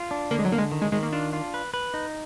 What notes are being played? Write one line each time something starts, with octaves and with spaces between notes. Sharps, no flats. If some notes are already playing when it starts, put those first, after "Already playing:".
Already playing: F4
D4
D3 A#3
G#3
F#3
D3 A#3
G#3
D#3
G#3
D#3 G#3
A#3
D4 F4
F4
B4
B4
D#4